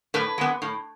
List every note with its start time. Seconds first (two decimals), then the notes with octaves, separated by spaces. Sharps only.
0.14 A2 B4
0.38 G#3 B3
0.62 A2